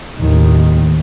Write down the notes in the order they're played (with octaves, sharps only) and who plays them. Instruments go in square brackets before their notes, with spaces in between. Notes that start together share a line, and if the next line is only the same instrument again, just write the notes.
[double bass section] D#2 A2 D#3